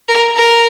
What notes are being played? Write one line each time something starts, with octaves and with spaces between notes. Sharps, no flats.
A#4
A#4